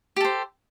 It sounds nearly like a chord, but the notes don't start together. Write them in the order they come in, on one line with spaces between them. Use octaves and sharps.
G4 A4 C5